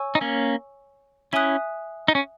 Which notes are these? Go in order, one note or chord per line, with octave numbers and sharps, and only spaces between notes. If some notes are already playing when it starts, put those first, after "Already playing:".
Already playing: C#5 G#5 C#6 E6
D#4
A#3 C#4
C#4 E4 E5 G#5 D#6 F#6
D#4
C#4